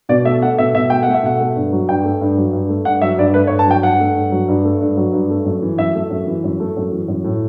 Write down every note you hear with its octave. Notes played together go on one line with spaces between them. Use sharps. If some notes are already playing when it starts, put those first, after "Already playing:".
B2 D5
A3 E5
A3 F#5
B2 E5
B2 E5
A3 G5
A3 F#5
E5
B2 F#5
A3
G2
F#3
G2 G5
A3
G2
F#3
G2
A3
G2 F#5
F#3 E5
G2 D5
A3 B4
C#5
G2
A5
F#3 G5
G2 F#5
A3
G2
F#3
G2
A3
G2
F#3
G2
A3
F#2
E3
F#2 E5
A3
F#2
E3
F#2
A3
F#2
E3
F#2
A2